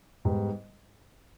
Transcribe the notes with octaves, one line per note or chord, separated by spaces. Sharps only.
G#2 G3 B3